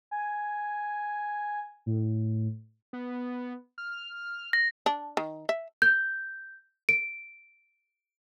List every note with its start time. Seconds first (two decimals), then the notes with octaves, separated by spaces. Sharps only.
0.11 G#5
1.86 A2
2.93 B3
3.78 F6
4.53 A#6
4.86 D4
5.17 D#3
5.49 E5
5.82 G6
6.89 D7